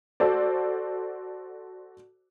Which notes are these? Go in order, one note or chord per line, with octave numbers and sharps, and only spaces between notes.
F#4 A4 C5 D5